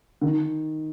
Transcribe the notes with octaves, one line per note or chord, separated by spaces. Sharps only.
D#3